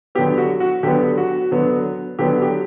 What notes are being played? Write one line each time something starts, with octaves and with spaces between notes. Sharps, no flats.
D3 F#3 B3 G4
F#4
F#4
D3 F#3 B3 G4
F#4
D3 F#3 B3
D3 F#3 B3 G4
G4